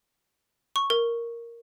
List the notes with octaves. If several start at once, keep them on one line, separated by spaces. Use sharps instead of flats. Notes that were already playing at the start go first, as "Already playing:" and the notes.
C#6
A#4